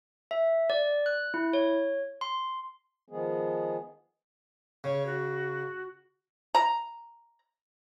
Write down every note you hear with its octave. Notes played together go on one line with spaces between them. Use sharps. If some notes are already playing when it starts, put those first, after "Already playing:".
E5
D5
F#6
E4
C#5
C6
D#3 F3 G#3 B3 G#4
C#3 C#5
F#4
A#5